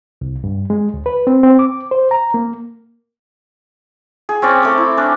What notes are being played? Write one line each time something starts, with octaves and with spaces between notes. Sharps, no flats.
C2
G2
G#3
D2
B4
C4
C4
D6
C5
A#5
A#3
G#4
C4 C#4 C#5 D5
A3 D6
E4
C#4 D4